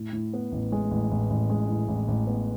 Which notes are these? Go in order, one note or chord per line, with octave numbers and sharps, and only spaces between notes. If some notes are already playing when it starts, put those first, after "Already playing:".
Already playing: A2
A2
B3
A1
G#3
A1
A1
A1
G#3
A2
A1
A1
B3